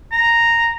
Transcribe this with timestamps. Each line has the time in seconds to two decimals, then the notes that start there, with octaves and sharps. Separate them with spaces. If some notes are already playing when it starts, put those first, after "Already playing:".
0.12 A#5